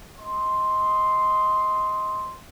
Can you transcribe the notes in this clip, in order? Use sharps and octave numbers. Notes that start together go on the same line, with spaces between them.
D#5 C6